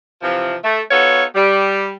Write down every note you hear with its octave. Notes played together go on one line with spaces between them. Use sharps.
C3 E3 F3
A3
B3 D#4 F4 F#4 A4 C#5
G3